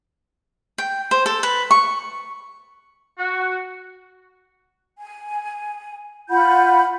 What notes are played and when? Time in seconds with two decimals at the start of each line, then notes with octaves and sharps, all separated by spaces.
0.78 G5
1.11 C5
1.26 A4
1.43 B4
1.71 C#6
3.19 F#4
4.97 G#5
6.29 F4 F#5 B5 G6